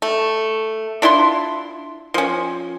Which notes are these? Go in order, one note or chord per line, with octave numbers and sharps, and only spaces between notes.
A3
D4 E4 F4 C6
F3 C#4